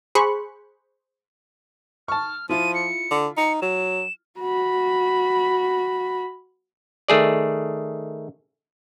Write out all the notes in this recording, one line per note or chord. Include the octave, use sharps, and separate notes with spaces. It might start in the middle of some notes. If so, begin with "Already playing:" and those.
G#4 C5 B5 C#6 F#6
A5 C#6 F6
F3 E4 F4 D#7
C#7
D3
D#4 C#7
F#3 E7
F#4 B5
D#3 A3 G#4 D5